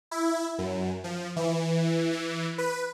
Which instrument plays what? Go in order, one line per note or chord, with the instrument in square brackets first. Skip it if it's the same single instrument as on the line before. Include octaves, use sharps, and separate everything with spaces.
[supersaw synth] E4
F#2
F3
E3
E3
B4